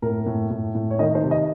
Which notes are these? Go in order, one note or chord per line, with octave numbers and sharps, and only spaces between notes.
A2 A#4
A2
A2
A2
C#5
D#3 D#5
C5
C3
D#5